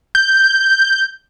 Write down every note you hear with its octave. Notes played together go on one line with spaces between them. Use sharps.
G6